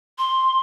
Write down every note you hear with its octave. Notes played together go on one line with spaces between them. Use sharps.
C6